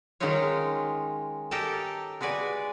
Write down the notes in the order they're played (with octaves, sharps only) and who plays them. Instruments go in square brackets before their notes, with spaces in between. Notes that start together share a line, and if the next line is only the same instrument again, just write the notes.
[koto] D#3 G#3 C#4 D#4 F4 C#5
G4 A4 A#4 D#5 G5 A5
G#3 F#4 B4 D5 G#5